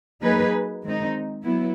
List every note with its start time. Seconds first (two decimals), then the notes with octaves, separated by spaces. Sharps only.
0.22 F#3 A#3 D#4 G#4 B4
0.84 D#3 G#3 C4 D#4
1.44 F#3 B3 E4